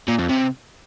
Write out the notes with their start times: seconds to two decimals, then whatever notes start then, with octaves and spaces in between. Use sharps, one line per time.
0.08 A#2
0.19 F2
0.29 C3